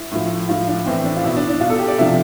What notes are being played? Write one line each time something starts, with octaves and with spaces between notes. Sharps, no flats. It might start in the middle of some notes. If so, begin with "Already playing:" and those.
Already playing: E4
A2 F3
A2 F3 F4
D4
A2 E3 C4
D4
F4
B2 E4
D4
D4
B2 F4
A4
G4
D5
C3 F3 E5